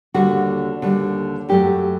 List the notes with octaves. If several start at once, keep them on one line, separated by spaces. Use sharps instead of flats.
D#2 D3 G3 F#4
D#2 D3 G3
F#2 F#3 A3 G4